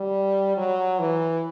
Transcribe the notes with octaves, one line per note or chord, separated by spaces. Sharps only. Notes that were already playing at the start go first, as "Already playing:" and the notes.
Already playing: G3
F#3
E3